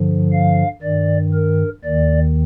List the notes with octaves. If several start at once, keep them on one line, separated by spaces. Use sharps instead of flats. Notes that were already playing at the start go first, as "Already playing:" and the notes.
Already playing: G2 D3 F3
F5
G2 D#3 D5
A#4
D#2 D#3 D5